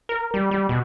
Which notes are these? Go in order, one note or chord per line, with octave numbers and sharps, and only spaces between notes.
A#4
G3
G3
B2